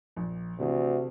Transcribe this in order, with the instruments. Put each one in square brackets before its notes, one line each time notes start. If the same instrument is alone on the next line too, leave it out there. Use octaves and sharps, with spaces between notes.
[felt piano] A#1
[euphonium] D2 [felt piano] C3 E3